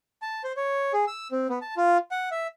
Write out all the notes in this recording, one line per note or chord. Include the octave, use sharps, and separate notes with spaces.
A5
C5
C#5
G#4
E6
C4
B3
A5
F4
F#5
E5